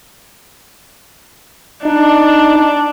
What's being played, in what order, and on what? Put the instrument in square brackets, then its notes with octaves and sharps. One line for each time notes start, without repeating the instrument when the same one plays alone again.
[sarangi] D4 [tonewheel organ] D#4